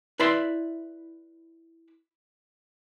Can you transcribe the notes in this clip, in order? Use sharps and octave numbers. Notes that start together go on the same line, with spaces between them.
E4 B4 D5 E5 B5 C6